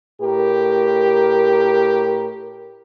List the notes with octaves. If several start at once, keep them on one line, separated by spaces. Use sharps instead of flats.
A2 G4 A#4